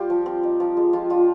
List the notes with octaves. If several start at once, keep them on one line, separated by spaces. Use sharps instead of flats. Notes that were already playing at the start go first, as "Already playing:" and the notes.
Already playing: G3 F4 G4
F3
C4
D#4
F3
G#3
F3 F4
D4 F4